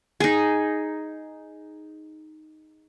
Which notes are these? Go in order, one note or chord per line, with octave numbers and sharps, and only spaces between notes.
D#4 G#4